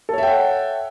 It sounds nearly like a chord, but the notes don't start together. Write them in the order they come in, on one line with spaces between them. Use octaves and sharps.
A4 C#5 E5 G5 F#5